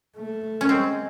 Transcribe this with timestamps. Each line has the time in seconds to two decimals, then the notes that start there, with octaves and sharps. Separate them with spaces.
0.17 A3
0.61 C#4
0.69 G#3 C4